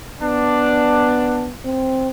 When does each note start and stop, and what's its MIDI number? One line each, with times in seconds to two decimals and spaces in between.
0.22 1.55 59
0.22 1.44 62
1.65 2.10 60